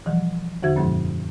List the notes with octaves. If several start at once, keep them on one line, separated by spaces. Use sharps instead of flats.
B2 E3 F3 G3
E2 D3 F#4 E5 G#6
F#2 A#2 F3 G#3 C4